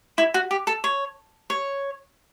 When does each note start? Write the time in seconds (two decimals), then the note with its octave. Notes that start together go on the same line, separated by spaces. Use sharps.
0.18 E4
0.34 F#4
0.51 G4
0.67 A4
0.84 C#5
1.50 C#5